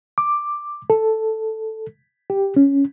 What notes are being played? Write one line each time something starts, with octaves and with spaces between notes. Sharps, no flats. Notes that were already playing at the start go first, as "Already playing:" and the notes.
D6
A4
G4
C#4